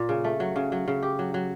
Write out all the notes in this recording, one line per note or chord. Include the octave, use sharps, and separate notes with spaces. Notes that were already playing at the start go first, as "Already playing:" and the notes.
Already playing: A#2
C#3
A3
F#3
C#3
F#3
C#3
G4
F#3
F#3